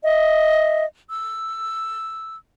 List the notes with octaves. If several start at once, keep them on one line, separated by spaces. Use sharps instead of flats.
D#5 E5
E6